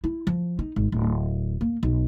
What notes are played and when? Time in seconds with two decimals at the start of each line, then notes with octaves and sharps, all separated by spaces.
0.04 E4
0.27 F3
0.59 D#4
0.76 G#1
0.92 D1
1.61 A#3
1.83 B1